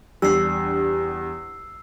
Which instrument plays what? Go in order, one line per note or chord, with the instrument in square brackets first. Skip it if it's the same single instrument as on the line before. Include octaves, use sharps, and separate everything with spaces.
[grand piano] E2 [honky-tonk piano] G3 D4 [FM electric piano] G4 [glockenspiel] E6 C7